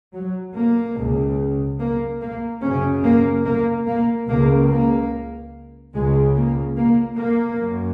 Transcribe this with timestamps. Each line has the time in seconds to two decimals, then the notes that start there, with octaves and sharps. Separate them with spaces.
0.13 F#3
0.55 A#3
0.96 C#2 C#3
1.79 A#3
2.21 A#3
2.62 F#2 C#3 C#4
3.04 A#3
3.45 A#3
3.87 A#3
4.28 C#2 C#3 A#3
4.69 A#3
5.94 C#2 C#3 G#3
6.36 A#3
6.77 A#3
7.18 A#3
7.60 F#2